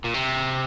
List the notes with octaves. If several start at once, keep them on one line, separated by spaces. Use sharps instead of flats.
A#2
C3